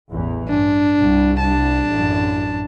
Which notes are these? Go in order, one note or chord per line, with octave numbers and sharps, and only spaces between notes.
A1 E2 E3
G2 D4
C2 G3
D4 A5
A1 F#2